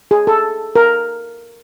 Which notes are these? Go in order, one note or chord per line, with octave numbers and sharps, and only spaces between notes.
G#4
A4
A#4